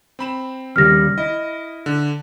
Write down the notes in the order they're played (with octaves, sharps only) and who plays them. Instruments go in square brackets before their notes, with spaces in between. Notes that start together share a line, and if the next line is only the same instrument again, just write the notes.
[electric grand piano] C4 B5 E7
[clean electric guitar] D#2 C#3 G3 [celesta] F6 A#6
[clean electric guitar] E4 [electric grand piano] D#5
[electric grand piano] D3